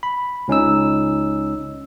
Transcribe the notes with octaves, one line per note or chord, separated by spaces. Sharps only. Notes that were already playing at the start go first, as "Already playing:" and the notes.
B5
C#2 C#4 D#4 E6